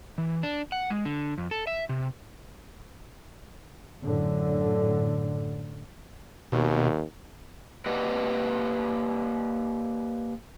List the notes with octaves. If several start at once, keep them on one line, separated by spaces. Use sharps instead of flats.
E3
D4
F#5
G#3
D3
F2
A4
E5
C3
F#2 A2 D3
D#2 B2
A#3 G4 B4 D5 D#5 F#5